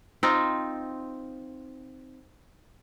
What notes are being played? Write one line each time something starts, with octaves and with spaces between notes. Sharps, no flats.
C4 D#4 F4